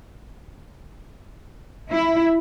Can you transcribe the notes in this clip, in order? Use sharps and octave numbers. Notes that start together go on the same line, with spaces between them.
E4